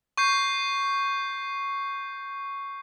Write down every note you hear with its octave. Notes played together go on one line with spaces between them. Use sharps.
C#6 G6 C7